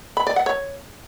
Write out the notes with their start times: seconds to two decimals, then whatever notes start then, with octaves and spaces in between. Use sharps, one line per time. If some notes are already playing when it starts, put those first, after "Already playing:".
0.17 B5
0.27 D5
0.36 F#5
0.46 C#5